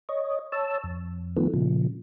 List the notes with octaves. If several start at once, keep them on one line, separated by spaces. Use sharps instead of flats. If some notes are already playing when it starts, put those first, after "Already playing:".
C#5 D#5
C#5 A5 E6
F2
D#3 F3 A3 B3
A#2 C#3 F3